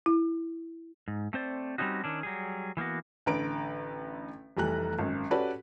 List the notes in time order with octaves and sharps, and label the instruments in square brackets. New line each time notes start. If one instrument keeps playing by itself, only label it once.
[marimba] E4
[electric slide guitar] G#2
A3 C4 C5 D5
G3 G#3 C4 C#4 D#4 F#4
D#3 C#4 D4
F#3 G3 G#4
E3 A#3 B3 F#4
[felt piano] A1 D3 B4 A#5 D7
F1 E3 G3 A3 A#5 F#6
G#1 F#2
C#4 F#4 G4 A4 B4 D5